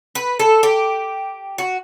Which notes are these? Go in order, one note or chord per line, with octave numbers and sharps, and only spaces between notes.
B4
A4
G4
F#4